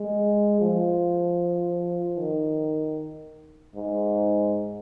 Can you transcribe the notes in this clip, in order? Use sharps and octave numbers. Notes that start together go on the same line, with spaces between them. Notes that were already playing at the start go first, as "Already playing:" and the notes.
Already playing: G#3
F3
D#3
G#2